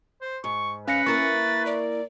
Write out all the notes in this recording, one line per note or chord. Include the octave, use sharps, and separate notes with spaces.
C5
G#2 C#6
C#4 B4 F5 A#6 C#7
A#3 E4 A#4 C#6 A6
D5